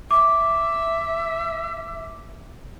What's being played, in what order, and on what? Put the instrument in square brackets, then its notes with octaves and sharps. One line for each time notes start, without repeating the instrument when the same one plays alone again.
[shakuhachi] E5 [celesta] D6